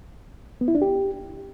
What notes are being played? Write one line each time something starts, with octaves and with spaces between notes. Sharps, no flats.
B3
E4
D4
G4